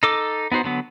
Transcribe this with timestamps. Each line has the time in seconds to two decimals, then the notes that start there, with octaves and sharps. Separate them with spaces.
0.03 D#4 A4 D6
0.52 B3 D#4 F#4 C5
0.64 D3 F#3 B3